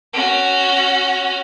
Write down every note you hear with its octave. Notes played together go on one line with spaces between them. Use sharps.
C#4 F#4